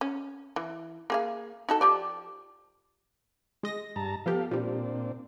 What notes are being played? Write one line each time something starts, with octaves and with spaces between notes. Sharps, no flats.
C#4
E3
A#3 G#4 F5
D#4 F#4 A4
F3 G4 D5
G#3 D#5 A#6
G2 A5 A#5
F3 B3 G4 A4 F5
A#2 F3 G3 C4 D4